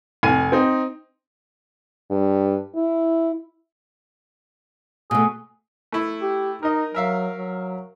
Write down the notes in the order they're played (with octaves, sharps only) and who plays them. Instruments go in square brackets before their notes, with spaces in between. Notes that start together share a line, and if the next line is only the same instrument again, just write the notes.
[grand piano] F1 G#5 D#7
C4 D#4
[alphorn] G2
E4
[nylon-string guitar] B2 A3 [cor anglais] G#4
[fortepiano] A3 E4
[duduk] G4
[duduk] D#4 [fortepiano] A#4 D#5
[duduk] F#3 [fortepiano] A#4 E5 F5
[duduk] F#3